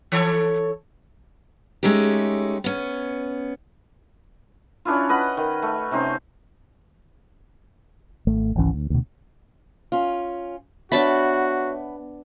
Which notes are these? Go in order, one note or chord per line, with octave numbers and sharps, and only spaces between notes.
E3 A4 C#5
G#3 A3 C#4 D#4 G4
B3 C#4
C#4 D4 E4 F4
B4 D#5 F#5 B5
D#3
A3
C3 C#4 D#4 C5
G#1 A3
G#1 C#2 E3 C#4
D2
D2 B2
C#4 F4
B3 D4 F#4 C#5 E5 A5 B5